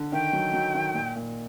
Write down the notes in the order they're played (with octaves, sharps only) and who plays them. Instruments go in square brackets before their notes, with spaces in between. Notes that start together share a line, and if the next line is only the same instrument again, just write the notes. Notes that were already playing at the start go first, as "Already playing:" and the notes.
Already playing: [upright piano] D3
[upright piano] D#3 [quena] G5
[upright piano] F#3
F#3
D#3
A#2
A#2